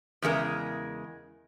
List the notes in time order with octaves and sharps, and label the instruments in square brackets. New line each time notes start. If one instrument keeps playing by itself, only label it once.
[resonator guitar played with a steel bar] E2 C#3 G#3 A#4